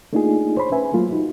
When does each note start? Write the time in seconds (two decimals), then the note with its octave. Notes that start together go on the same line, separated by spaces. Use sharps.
0.13 A3 A#3 D4 D#4 F4 G#4
0.57 C5 C#5 B5 C6
0.72 C#4 B4 E5 G#5
0.94 F#3 A3 A#3 F4
1.12 D#4 F#4